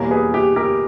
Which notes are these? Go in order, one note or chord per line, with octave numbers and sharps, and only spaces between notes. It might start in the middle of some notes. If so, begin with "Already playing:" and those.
Already playing: E2 B2 G3 A#3 A#4 C#5
G#4 B4
G4
G4 A#4